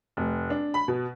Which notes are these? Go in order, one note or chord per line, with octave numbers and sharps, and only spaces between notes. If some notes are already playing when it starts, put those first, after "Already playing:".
F1
D4
B5
B2